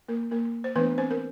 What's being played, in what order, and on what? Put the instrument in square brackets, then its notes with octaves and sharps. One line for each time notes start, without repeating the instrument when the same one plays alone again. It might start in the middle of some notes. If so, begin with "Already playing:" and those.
[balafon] A#3 A#4
A#3 A#4
C5
E3 A3 B3 D4 B4
C4 C5
A#4